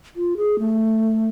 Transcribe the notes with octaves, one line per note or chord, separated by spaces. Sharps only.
F4
G#4
A3